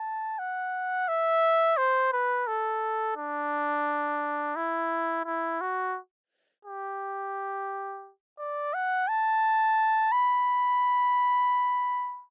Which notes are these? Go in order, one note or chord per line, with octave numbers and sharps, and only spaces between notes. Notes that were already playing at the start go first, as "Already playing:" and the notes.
Already playing: A5
F#5
E5
C5
B4
A4
D4
E4
E4
F#4
G4
D5
F#5
A5
B5